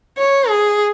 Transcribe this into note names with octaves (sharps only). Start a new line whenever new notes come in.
C#5
G#4